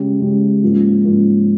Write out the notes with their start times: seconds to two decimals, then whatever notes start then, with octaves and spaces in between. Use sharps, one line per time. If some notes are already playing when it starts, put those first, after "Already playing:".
Already playing: C#3 G#3 C#4 G4
0.20 C#3 G#3 C#4 G4
0.63 G#2 F3 A#3 C#4
1.04 G#2 F3 A#3 C#4